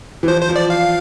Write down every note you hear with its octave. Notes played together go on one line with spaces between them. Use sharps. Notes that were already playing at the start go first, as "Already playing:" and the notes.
E3
F3 C5
C5
F3
D5
F5